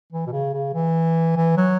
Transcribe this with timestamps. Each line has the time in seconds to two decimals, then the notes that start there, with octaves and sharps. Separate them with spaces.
0.13 E3
0.27 B2
0.32 C#3
0.54 C#3
0.74 E3
1.36 E3
1.57 F#3